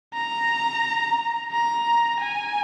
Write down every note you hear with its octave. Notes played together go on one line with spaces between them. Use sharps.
A#5
A#5
G#5